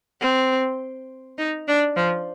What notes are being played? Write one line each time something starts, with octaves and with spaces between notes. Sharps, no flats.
C4
D#4
D4
F3